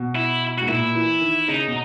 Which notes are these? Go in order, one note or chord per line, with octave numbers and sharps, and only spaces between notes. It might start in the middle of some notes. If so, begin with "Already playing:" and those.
Already playing: B2
E4
G#2 F#4
A#2 E4
E3
D#3
C#3 D#4
B2